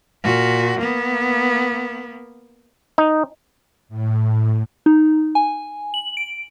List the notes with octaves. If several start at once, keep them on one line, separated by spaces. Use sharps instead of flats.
A#2 F#4
A#3 B3
D#4
A2
D#4
G#5
F#7
D7